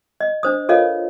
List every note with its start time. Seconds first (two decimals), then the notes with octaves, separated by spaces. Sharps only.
0.20 D#5
0.43 D4 C5 D#6
0.69 F4 A4 A#4 C#5 D#5 F5